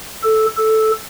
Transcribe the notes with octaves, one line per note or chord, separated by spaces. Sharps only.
A4
A4